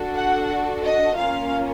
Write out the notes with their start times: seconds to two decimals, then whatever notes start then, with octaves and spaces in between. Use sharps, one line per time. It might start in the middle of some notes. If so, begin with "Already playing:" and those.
Already playing: D4 F#4 A4
0.16 F#5
0.83 D#5
1.16 A#3 C#4 F4 F5